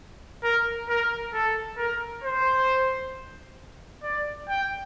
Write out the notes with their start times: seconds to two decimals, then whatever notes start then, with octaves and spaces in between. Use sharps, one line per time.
0.43 A#4
0.89 A#4
1.33 A4
1.78 A#4
2.24 C5
4.03 D5
4.49 G5